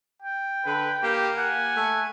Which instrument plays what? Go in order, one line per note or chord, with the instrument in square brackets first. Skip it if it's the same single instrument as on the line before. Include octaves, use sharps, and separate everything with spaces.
[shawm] G5
[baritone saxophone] D3 [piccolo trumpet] B4
[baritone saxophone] A#3 [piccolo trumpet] G4
[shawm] F#5 [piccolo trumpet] G#5
[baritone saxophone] A3